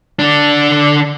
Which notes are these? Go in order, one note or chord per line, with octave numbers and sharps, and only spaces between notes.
D3 D4